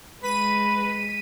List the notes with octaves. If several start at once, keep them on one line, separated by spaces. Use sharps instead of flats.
G#3 B4 B6 D#7